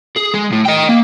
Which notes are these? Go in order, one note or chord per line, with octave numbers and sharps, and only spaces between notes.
G#4
G#3
A2
D#5 G5
A#3